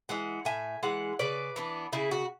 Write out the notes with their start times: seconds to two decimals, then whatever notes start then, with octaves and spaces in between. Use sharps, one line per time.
0.09 E3 G#3 F#5
0.45 A2 E5 G#5
0.83 E3 G#3 F#5
1.19 C#3 B4 D5
1.56 E3 B3 D4
1.93 C#3 E4 G#4
2.11 F#4